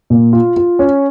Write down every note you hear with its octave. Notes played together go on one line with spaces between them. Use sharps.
A#2
F4
F4
C#4